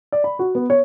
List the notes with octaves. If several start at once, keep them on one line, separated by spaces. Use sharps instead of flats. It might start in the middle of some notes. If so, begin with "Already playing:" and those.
D5
B5
F#4
B3
C#5